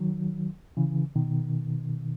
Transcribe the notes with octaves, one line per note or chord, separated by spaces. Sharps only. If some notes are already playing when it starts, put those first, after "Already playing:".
Already playing: D#3 F#3
C#3 E3
B2 D#3